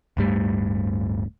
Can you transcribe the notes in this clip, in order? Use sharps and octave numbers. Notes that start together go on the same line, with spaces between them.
D1 G2 G3 A3